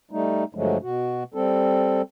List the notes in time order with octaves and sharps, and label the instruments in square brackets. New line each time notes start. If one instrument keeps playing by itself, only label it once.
[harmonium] G3 A3 D#4
G2 D3 F3 F#3 G#3 A3
B2 F#4
G3 C4 A4